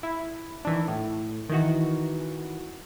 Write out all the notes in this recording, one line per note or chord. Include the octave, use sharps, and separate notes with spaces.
E4
D#3 E3 D4
A2
D#3 E3 F#4